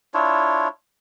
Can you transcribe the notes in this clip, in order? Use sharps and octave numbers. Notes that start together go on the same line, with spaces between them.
D4 E4 F4 C#5